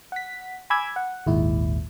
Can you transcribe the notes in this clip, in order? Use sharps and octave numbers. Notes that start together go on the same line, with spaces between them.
F#5 B6
G#5 B5 D6 E6 G#6
F#5
G#1 D#2 A#2 G#3 E4